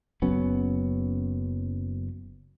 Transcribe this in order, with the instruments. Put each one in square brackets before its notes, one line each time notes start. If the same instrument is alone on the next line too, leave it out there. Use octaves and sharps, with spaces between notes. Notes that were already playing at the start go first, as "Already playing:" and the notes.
[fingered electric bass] F#1 F#3 B3 C#4